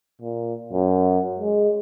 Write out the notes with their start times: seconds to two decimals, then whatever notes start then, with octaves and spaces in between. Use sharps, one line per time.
0.22 A#2
0.73 F#2
1.39 G#3